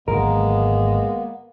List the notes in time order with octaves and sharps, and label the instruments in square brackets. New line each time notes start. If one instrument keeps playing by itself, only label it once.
[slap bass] G#1 D3 F#3 [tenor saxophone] G#3 [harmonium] A#3 B3 [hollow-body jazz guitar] A#4